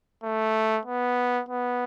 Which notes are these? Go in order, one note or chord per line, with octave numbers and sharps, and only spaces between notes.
A3
B3
B3